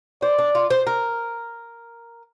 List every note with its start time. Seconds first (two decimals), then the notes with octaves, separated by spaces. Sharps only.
0.22 C5 D5
0.39 D4
0.55 F4
0.70 C5
0.87 A#4